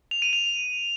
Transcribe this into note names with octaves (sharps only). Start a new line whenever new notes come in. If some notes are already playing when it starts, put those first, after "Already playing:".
F7
D#7
F7